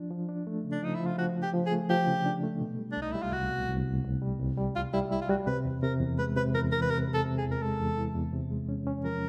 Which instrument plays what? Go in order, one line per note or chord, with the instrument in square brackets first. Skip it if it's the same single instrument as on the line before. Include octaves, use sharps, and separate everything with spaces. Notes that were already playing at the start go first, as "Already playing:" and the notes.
Already playing: [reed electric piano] F3 D4
F3
D4
A3
C#3
[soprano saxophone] D4
[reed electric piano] F3 [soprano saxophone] D#4
[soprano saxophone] E4
[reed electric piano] F3
[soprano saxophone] F4
[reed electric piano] F3 [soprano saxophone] F#4
[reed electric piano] F3
[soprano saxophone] G4
[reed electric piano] F3
[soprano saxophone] G#4
[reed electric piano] A3
[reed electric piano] F3 [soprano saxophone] G4
[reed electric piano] C#3
D4
A3
B2
G3
[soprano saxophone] D4
[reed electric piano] C2 [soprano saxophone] D#4
[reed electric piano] G3 [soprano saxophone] E4
[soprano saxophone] F4
[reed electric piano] C2 [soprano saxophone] F#4
[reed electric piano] B2
C2
C2
C2
G3
C2
G3
[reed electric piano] C2 [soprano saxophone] F4
[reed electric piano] G3 [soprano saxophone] E4
[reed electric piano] G3 [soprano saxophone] E4
[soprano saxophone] F4
[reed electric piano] G3 [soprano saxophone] F#4
[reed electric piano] C3 [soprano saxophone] B4
[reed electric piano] E2
[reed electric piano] C3 [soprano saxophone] A#4
[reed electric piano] E2
[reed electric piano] G#3 [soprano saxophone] B4
[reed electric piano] C3 [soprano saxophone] B4
[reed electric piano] E2 [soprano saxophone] A#4
[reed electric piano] E3 [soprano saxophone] A#4
[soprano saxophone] B4
[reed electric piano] C3 [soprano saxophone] A#4
[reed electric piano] C3
[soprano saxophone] A4
[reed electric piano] C3
[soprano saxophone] G#4
[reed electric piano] E2
[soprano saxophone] A#4
[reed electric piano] G#3 [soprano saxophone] A4
[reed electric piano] E2
E3
E2
C3
G#3
C#4
C#4
[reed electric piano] F3 [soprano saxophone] A#4